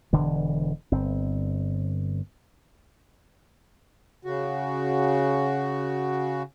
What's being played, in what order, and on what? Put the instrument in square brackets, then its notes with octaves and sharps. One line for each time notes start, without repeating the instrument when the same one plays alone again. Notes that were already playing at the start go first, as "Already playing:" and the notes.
[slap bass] E1 D3 E3
G1 C4
[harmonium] C#3 F#4